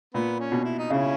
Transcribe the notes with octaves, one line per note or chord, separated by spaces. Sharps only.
A#2 B3
C#4
B2
E4
D#4
C#3 C#4 E4